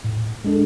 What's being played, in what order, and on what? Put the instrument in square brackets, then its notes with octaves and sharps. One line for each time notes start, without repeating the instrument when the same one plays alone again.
[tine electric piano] A2
G#3 D4 A4